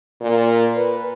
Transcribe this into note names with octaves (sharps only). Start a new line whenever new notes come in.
A#2
B4